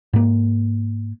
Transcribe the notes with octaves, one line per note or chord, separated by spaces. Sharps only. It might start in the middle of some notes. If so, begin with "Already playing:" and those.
G#2 A#3